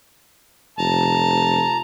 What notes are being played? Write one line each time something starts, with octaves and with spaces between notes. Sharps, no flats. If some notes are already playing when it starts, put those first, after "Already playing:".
F1 A5 A#5